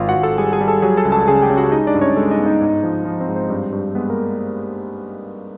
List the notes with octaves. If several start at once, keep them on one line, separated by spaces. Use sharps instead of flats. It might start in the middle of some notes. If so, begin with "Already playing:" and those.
Already playing: G#1 F4 F5
F#4 F#5
G#1
A4 A5
G3 G#4 G#5
G#4 G#5
G3
A4 A5
F#3 G#4 G#5
A4 A5
C#2
A4 A5
C#3 G#4 G#5
G4 G5
C#3
F#4 F#5
G#3 D#4 D#5
D4 D5
G2
C#4 C#5
G#3 A4
D#4 D#5
B3
D#4 D#5
G#2
F3
F3
C4 C5
G#2
C4 C5
G2
G2
G#3 B3 B4
A#3 A#4